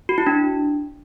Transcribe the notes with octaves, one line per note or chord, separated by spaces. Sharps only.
F#4
E4
D4